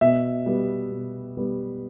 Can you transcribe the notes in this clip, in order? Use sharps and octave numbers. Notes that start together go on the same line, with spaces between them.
B2 E5
G3 B3
B2
G3 B3